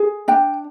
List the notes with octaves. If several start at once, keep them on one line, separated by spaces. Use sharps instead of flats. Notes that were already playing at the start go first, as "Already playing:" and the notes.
Already playing: G#4
D4 G5